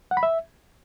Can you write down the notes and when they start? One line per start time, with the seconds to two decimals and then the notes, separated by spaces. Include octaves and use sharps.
0.11 F#5
0.17 B5
0.23 E5